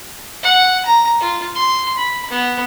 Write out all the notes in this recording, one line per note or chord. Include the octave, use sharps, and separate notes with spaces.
F#5
A#5
F4
C6
B5
B3